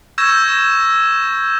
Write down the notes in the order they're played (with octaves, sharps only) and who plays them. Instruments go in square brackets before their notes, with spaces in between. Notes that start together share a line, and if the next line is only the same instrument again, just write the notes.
[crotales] C#6 E6 G6 G#6 A#6 E7